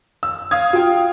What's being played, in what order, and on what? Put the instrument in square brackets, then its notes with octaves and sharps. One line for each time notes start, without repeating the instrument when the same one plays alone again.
[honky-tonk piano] E6
F5 D#6 G#6
[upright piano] F4 G5